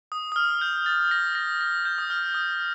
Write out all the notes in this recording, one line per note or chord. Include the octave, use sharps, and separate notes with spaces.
D#6
D#6
F6
G6
A6
A#6
A#6
A#6
G6
D#6
F6
D#6